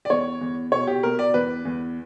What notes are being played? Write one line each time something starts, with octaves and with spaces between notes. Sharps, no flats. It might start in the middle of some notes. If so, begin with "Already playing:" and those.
D5
E2 C#5
E2
B2 C#5
G4
B2 A#4
D5
E2 B4
E2